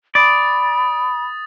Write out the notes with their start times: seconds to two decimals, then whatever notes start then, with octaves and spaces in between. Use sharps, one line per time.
0.15 D5 B5 D#6 A6